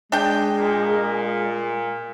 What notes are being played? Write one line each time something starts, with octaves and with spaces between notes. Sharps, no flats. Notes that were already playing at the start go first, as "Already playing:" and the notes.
G#3 D4 G5
A#2